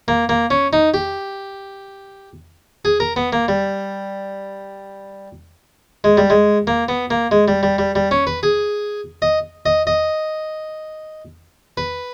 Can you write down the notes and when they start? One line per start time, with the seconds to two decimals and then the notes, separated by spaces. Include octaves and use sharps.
0.08 A#3
0.29 A#3
0.50 C#4
0.73 D#4
0.94 G4
2.85 G#4
3.00 A#4
3.16 B3
3.33 A#3
3.48 G3
6.04 G#3
6.17 G3
6.30 G#3
6.67 A#3
6.88 B3
7.10 A#3
7.31 G#3
7.48 G3
7.63 G3
7.78 G3
7.95 G3
8.11 C#4
8.27 B4
8.43 G#4
9.22 D#5
9.66 D#5
9.87 D#5
11.77 B4